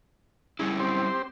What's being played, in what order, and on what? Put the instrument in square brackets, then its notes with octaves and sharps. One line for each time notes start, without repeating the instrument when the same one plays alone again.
[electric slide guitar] G3 C#4 E4 [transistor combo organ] G#4
[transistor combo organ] C4 G4 C5